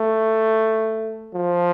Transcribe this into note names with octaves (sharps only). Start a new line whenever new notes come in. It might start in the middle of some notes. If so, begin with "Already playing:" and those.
Already playing: A3
F3